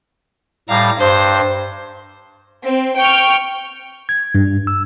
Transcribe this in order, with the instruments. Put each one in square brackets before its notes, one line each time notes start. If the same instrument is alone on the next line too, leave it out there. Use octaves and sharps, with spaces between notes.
[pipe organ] A2 G3 [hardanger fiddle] F5 A#5
[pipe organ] G2 [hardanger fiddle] C5
[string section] C4
G5 C#6 F6
[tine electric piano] G#6
G2
E6